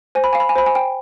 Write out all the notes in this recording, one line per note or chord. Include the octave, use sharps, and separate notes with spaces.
C5 G#5
B5
F5 G#5
B5
G#5
C5 B5
G#5
G5